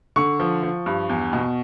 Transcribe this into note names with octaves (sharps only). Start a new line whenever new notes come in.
D3 C#6
F3
F3
G2
E2
B2